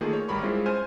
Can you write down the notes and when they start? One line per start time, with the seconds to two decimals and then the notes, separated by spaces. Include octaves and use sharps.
0.01 D#3 A3 A#3 D#4 F4 G#4
0.13 C#5
0.28 G#1 G3 A#4 B5 C#6
0.42 G3 G#3 C4 C#4 E4 F4
0.66 C5 G#5 F6 D#7